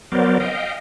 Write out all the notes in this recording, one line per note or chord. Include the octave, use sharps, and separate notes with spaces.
F#3 B3 A#4 C5 D5
D#5 F5 G5